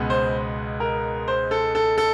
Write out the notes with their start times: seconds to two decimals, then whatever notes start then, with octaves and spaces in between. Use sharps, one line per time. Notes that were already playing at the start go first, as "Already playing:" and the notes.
Already playing: C#2 B2 G#3 B3
0.10 C5
0.80 A#4
1.28 C5
1.51 A4
1.75 A4
1.98 A4